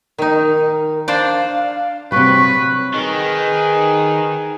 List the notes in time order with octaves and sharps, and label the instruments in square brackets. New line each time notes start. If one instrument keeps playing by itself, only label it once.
[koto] D#3 D#4 [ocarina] A#4
[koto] D4 C5 D5 [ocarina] F5
[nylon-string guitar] C3 F#3 G3 [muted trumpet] B4 [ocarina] C#6
[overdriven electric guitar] D#3 [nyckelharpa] G#4 B4